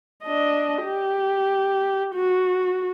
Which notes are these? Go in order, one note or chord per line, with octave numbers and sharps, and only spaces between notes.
D4 D#5
G4
F#4